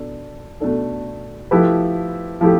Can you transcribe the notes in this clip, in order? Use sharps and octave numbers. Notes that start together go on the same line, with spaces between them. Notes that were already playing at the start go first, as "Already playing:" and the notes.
Already playing: B2 D4 A4
B2 A3 D4 A4
F3 A3 E4 G4 B4
F3 A3 E4 G4